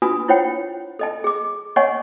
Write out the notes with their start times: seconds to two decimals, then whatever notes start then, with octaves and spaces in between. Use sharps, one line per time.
0.02 D4 F4 F#4 B4 G#5 D#6
0.28 E4 F4 C5 C#5 F#5 G5
0.99 A4 D#5 A5
1.24 G#4 D6
1.76 C#5 D#5 F#5 G#5 C6 C#6